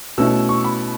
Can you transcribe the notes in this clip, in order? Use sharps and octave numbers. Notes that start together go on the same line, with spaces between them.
B2 A3 C#4 E4 E6
C#6
B5